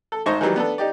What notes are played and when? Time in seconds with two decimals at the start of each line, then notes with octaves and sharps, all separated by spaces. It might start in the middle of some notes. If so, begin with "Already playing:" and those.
0.12 A4
0.26 G#1 G#2 D#4 C5 D#5 C#6
0.41 D#3 E3 F#3 G3
0.56 B3 D4 A4
0.78 D#4 G4 D5